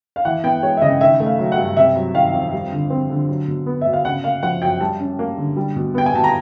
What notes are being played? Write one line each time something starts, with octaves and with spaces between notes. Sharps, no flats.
F5
E3 F#5
B3 G5
G#3 C#5
E5
C#3 D#5
D#3 E5
A3
F5
F#3
F#5
G2
C3 E5
F#3
D#3 F5
F2
G3
D3
C4
D3
F#3
B2
B3
B2 E5
F5
C#3 F#5
A#3 F5
F3 F#5
F#2 G5
G3 A5
C#4
A#3
D3
G3
B2
B3 G5
G#5
B2 A5
A#5